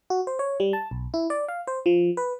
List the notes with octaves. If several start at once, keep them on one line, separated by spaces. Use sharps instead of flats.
F#4
C5
C#5
G3
A5
B1
E4
D5
F5
C5
F3
B4